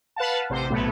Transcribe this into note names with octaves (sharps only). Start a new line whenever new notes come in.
B4 F5 F#5 A5
A1 C3 C5
B1 A2 A3 B3